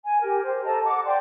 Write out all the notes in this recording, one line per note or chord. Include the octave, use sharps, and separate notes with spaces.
G#5
G4 A#4
G4 C5
A4 D#5 A5 A#5
F#5 D6
D5 G5 C6